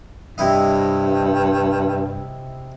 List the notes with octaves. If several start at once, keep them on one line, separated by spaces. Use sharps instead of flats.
G2 C3 E4 D#5